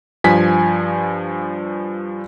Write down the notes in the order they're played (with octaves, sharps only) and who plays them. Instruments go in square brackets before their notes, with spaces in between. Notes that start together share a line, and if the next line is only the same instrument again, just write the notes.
[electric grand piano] G2 F3 G#5 B6